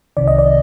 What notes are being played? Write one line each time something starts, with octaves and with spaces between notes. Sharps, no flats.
C2 C3 D#3 D5
D#5
D5